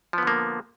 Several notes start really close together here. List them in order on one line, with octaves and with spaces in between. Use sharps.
F3 B3 D3 A#3